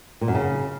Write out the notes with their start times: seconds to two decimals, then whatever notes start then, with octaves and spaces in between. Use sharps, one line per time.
0.21 A#2
0.28 F#2
0.35 C#3